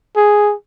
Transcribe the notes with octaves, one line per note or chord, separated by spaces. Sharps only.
G#4